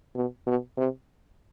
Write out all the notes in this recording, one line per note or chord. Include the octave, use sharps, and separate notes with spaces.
B2
B2
C3